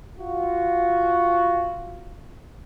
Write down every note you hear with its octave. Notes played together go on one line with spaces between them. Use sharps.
F4 F#4